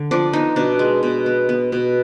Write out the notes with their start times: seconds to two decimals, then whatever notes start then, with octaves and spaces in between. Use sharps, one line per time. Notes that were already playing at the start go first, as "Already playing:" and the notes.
Already playing: D3
0.11 F3 D4
0.33 B3 D#4
0.56 B2 D4
0.79 G#3
1.03 B2
1.26 B3
1.49 B3
1.72 B2